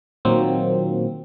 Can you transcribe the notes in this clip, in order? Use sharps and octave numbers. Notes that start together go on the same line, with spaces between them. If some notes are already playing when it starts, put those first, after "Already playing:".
A#2 D#3 F#3 A#3 C4